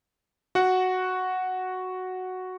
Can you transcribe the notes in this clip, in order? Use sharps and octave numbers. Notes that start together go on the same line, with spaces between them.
F#4 F#5